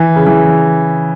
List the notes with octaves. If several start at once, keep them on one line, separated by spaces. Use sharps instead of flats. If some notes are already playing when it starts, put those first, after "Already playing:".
Already playing: E3
C#3
E3